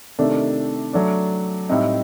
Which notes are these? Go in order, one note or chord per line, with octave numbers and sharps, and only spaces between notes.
C3 D#3 A3 D4
F#3 A3 D4
A2 G3 C4 D#4